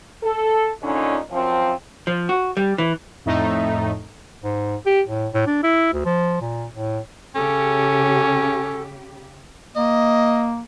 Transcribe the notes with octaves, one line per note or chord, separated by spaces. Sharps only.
A4
A#2 D3 C#4 D#4
F#2 F3 C4
F3
F#4
G3
E3
F2 A2 A3 D#4
G#2
G4
A2
A2
D4
E4
D2
F3
A#2
A2
C#3 C#4 G4 A4
A#3 D#5